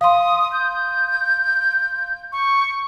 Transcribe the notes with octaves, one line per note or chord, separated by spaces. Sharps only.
F5 C6 D#6
G6
C#6